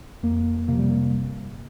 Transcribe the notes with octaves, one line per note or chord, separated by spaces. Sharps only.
F2 A#3
C3 F3 A#3
G3
A#3
G1